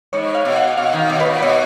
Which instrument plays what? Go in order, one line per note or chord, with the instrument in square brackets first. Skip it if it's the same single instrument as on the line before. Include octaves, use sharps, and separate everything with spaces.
[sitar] G#2 [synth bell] C#5
[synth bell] F5
[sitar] B2
[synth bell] F#5
[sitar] B2 [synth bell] F5
[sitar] D#3
[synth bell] F5
[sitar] B2
[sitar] A#2 [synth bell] B4
[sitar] B2 [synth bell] C#5